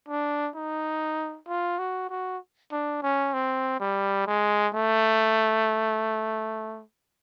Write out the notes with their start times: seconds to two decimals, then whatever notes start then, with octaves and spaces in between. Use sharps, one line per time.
0.08 D4
0.55 D#4
1.48 F4
1.79 F#4
2.10 F#4
2.72 D4
3.03 C#4
3.34 C4
3.80 G3
4.27 G#3
4.74 A3